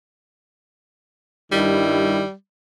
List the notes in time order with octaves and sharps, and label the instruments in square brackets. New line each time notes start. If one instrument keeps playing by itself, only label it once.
[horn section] G2 D#3 E4 [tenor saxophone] G3